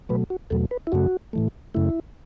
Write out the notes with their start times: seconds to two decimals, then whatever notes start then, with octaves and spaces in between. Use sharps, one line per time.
0.09 B2 F#3 A3 B4
0.30 F#4
0.50 E2 B2 F#3 A3 A4
0.71 B4
0.87 E4
0.92 F#2 C#3 A3 F#4
1.33 A2 E3 A3
1.74 F#2 C#3 A3 E4